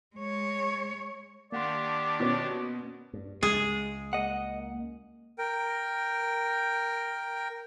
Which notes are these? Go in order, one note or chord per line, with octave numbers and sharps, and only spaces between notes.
G#3 C#5
D#3 A#3 D4 G4 D5 F#5 C6
B2 C#4
G2
C#2 G#3 G#4
A#3 D#5 F#5
A#4 G5